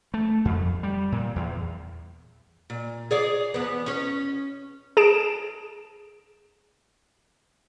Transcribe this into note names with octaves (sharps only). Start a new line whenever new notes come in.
A3
F2
G3
A#2
E2
A#2
G#4 C#5 D5
E2 B3
C#4 C#5
G#4 A5 D7 E7